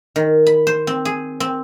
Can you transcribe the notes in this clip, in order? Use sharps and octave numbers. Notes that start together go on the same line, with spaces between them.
D#3
B5
C5
C4
G#4
C4